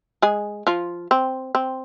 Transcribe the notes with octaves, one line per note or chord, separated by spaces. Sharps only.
G#3 G#4
F3 F4
C4
C4